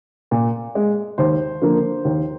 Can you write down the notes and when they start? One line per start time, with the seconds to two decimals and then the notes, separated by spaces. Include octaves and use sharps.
0.31 A#2
0.75 G#3
1.18 D#2 C5
1.61 D3 F3 A#3
2.05 D#2